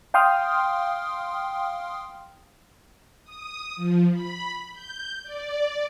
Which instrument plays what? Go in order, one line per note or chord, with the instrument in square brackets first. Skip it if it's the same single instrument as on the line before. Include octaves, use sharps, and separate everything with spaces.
[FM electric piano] F5 G5 C6 D#6 F6
[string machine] D#6
F3
B5
G6
D5